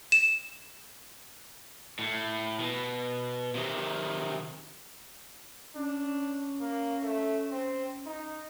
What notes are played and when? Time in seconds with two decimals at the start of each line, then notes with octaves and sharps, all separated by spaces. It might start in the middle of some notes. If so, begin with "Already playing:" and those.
0.12 E7
1.99 A2
2.60 B2
3.55 C3 D#3
5.76 C#4 D4
6.61 A#3
7.03 A3
7.52 C4
8.06 D#4